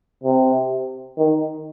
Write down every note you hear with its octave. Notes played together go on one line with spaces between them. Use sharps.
C3
D#3